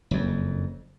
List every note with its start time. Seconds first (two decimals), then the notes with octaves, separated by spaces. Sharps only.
0.11 F#1 F2